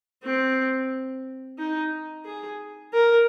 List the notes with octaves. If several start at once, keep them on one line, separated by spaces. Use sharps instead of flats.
C4
D#4
G#4
A#4